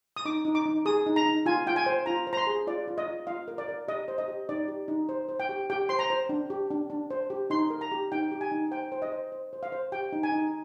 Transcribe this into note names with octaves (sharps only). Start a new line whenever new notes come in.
D#6
D#4 D6
D#4
D6
D#4
G#4 D#6
D#4
A#5
D#4
F4 G#5
F4 G5
G#5
C5
F4 A#5
C5
A#5
C6
G#4
F4 D5
F4
D#5
F4
F4 F5
A#4
D5
A#4
G4 D#5
C5
D#5
G4
D#4 D5
G4
D#4
C5
C5
G5
G4
G4 G5
C5 C6
A#5
C5
D4
G4
D4
D4
C5
G4
D#4 C6
A#4
A#5
G4
D#4 G5
G4
G#5
D#4
C5 G5
C5
D#5
C5
C5
C5
F5
C5
G4 G5
D#4
G#5
D#4